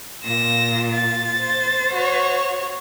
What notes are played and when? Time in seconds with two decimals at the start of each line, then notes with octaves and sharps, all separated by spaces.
0.24 A#2 F4 A#6 E7
0.92 A6
1.39 C5
1.94 F#4 C#5